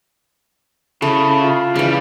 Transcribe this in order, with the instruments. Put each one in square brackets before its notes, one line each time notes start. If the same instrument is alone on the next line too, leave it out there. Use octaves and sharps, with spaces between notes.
[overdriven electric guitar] C#3 [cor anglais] E4 [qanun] A4
[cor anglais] F4
[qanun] C#3 E3 [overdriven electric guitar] G3